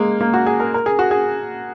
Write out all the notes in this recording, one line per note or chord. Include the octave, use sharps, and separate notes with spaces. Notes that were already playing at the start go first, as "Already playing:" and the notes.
Already playing: G#3 A#3
A#3
F#4
G#4
A#4
A#4
G#4
F#4
G#4